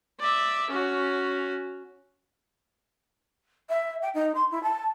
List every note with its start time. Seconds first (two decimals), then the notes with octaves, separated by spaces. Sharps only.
0.20 D5 E5
0.71 C#4 F#4
3.69 E5
4.02 G5
4.14 D#4
4.35 C6
4.51 E4
4.63 A5